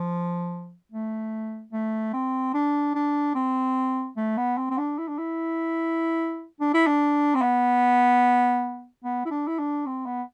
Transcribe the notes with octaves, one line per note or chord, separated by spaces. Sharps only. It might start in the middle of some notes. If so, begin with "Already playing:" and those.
Already playing: F3
A3
A3
C4
D4
D4
C4
A3
B3
C4
C4
D4
E4
D4
E4
D4
E4
D4
C4
B3
B3
E4
D4
E4
D4
C4
B3